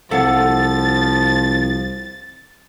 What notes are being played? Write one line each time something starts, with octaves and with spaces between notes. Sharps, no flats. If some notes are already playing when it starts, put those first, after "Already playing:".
C2 F3 A4 F5 F#5 A6